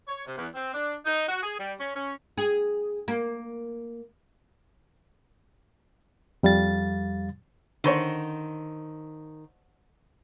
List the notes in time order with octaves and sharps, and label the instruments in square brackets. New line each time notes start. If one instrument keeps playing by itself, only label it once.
[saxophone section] C#5
C3
E2
C4
D4
D#4
F#4
G#4
G3
C#4
C#4
[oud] G#4
A#3
[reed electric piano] F2 G3 F5 A6
[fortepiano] D3 C5 C#5 [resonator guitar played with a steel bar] D#3